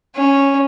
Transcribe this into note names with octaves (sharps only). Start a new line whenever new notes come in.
C#4